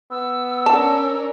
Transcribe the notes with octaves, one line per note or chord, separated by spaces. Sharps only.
B3 E6
C#4 D4 A#4 A5